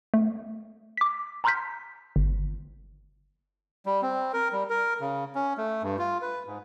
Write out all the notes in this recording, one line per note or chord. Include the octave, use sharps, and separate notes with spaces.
A3
D6 B6
A5 A#5 C6 F6 G6 B6
G1
G3
C4
A#4
G3
A#4
C#3
C#4
A3
G2
F4
B4
G#2